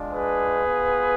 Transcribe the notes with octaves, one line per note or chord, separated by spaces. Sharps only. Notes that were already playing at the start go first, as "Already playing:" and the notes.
Already playing: G#3 D4 F4
G#4 B4
B3 F4